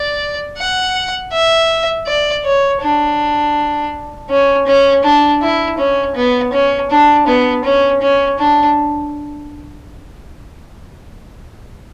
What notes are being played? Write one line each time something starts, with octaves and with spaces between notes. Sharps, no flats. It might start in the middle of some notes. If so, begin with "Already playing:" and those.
Already playing: D5
F#5
E5
D5
C#5
D4
C#4
C#4
D4
E4
C#4
B3
C#4
D4
B3
C#4
C#4
D4